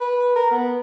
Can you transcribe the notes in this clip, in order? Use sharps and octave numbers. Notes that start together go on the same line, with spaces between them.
B4
A#4
B3